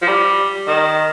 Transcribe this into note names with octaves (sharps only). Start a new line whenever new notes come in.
F3
G3
D#3